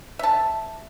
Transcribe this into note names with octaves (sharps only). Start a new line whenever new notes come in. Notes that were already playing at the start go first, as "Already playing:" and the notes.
E5 A5